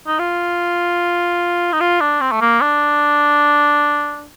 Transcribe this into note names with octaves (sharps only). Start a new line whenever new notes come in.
D#4
F4
D#4
F4
D4
C4
A3
A#3
D4